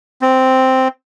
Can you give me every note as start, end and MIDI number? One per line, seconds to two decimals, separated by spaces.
0.22 0.88 60